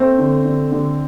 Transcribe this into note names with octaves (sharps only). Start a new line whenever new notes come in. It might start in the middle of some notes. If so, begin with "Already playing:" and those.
Already playing: A3 C4
D3
D3
D3